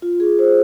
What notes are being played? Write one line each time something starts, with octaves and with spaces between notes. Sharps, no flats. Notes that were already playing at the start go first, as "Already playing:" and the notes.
F4
G#4
C5